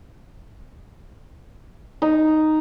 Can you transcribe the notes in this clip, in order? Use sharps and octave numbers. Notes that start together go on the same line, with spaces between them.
D#4